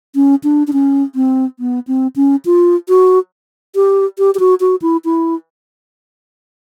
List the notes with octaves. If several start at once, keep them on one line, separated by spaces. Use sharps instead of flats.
C#4
D4
D4
C#4
C4
B3
C4
C#4
F4
F#4
G4
G4
G4
F#4
F#4
E4
E4